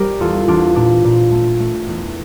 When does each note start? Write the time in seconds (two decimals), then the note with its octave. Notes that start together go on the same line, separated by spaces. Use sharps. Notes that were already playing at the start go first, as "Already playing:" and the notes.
Already playing: G3 G4 A#4
0.20 E2 F4 A4
0.48 E2 D4 F4
0.76 A#2 D4
1.04 A#2
1.32 A3
1.60 A3
1.87 E2